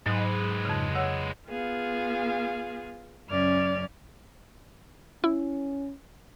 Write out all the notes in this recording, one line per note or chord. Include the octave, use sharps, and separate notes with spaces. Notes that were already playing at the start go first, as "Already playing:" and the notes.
G#2 F#3 G#3 B4
F2 C#3
C#5 F#5 E6
B3 F4 G#4 F5
F#2 C#3 C#4 D5 F6 G#6
C#4 E4